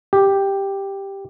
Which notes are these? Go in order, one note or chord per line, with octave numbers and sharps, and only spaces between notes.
G4